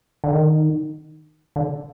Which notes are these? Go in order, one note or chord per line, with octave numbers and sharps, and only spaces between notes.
D3
D#3
D3